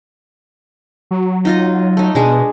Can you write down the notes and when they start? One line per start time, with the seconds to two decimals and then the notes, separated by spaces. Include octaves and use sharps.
1.11 F#3
1.45 D#4 F4 D#5
1.97 A3 D#4
2.15 B2 G#3 D4 G#4